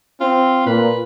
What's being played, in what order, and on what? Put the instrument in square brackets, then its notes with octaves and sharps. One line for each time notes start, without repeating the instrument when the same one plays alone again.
[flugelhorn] C4 [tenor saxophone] F4
[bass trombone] A#2 [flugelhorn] F4 [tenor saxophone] B4